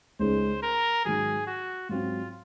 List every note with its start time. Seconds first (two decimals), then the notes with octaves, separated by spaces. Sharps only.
0.20 C#2 C#3 G#3 D#4 G#4 C5
0.63 A#4
1.05 G#2 D#3 F#3 G#4
1.47 F#4
1.89 G#2 F#3 C4 F4